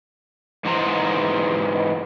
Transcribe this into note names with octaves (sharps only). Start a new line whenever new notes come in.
G#2 E3 D#4 C5 A#5